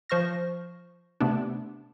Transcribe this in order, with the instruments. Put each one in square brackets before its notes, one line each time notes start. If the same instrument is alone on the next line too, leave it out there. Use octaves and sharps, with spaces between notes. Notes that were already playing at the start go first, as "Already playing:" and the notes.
[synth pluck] F3 C5 C#6 F6 A#6
C3 A3 B3 D4